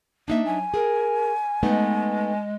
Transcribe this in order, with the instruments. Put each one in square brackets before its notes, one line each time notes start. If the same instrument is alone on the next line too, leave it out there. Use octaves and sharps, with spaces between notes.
[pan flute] A#3 [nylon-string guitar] D4 D#4 E5
[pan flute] F#3 [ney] G#5
[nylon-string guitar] G#4 [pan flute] A#4
[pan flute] G#3 [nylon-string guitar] A3 B3 D#4